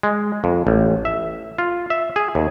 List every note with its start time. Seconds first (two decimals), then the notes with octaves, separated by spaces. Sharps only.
0.03 G#3
0.44 F2
0.67 A1
1.05 E5
1.58 F4
1.90 E5
2.16 G#4
2.35 D#2